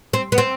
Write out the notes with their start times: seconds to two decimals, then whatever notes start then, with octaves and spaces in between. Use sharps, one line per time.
0.13 C4
0.32 B3
0.38 C4